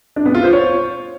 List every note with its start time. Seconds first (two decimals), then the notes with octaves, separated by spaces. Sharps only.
0.16 D4
0.25 B3
0.35 F4
0.44 C5
0.53 C#5